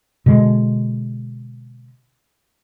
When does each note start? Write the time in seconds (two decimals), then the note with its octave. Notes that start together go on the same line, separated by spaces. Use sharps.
0.26 B2 D3 G#3